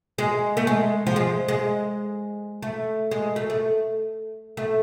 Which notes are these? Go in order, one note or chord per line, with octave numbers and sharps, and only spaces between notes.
G#3
A3
G#3
F3
G#3
G#3
A3
G#3
A3
A3
A3